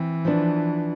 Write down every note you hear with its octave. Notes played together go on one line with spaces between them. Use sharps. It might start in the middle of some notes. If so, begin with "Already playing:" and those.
Already playing: E3 C4
F3 B3 D4